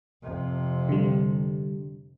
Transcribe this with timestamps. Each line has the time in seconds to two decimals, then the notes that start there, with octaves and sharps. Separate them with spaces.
0.22 F2 C3
0.89 D3 G3